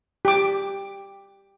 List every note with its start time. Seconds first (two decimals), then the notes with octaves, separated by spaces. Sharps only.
0.25 G4 D6